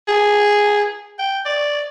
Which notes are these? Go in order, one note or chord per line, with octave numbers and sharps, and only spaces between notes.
G#4
G5
D5